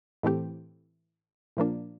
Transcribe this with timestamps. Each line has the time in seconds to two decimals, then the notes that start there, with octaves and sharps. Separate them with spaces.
0.23 A2 E3 A3 C4 G4
1.57 A#2 F3 A#3 D4